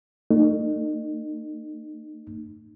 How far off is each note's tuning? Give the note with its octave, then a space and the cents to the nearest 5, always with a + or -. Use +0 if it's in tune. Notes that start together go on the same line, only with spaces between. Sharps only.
A3 +40 D#4 -35